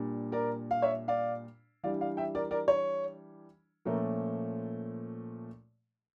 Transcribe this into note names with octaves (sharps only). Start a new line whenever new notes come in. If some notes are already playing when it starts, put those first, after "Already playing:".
Already playing: A#2 G3 D4
A#4 D5
F5
C#5 E5
D5 F5
E3 G3 D4 D5 F5
D5 F5
E5 G5
A#4 D5
A#4 D5
C#5
A#2 F3 A3 C#4 A#4